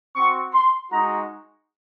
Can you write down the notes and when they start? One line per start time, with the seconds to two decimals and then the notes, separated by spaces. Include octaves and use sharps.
0.15 C4 F#4 C#6
0.53 C6
0.91 G#3 D#4 F#4 A#5